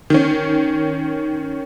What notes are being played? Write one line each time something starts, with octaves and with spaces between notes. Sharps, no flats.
D#3 C#4